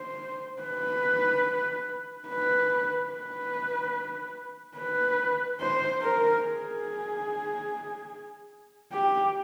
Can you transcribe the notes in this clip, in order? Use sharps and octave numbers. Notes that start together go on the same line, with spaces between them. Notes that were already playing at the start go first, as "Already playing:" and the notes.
Already playing: C5
B4
B4
B4
B4
C5
A#4
G#4
G4